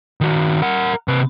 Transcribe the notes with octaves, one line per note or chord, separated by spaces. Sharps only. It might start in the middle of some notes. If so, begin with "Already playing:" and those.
D#3 F#4
A#4 F#5
C3 B4